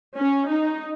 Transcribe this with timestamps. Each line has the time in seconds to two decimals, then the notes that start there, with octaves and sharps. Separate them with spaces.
0.16 C#4
0.48 D#4